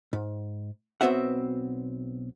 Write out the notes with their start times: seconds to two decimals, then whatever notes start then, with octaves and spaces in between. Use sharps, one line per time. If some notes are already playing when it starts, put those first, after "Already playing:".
0.13 G#2
1.01 B1 B3 C4 F#4 E5 F#5